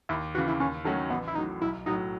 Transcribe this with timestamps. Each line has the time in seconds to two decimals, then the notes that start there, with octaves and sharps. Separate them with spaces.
0.09 D#2 E4
0.35 C#3 E3 F#4
0.48 E4
0.60 D#2 C#4
0.84 D#3 F#3 A3 C#4 F#4
1.10 A1 B3
1.28 E4
1.35 A2 F#3 D#4
1.62 B1 E4
1.86 A2 F#3 D#4